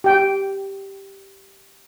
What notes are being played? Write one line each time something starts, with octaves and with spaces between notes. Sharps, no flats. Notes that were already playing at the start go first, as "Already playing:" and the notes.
G4 G5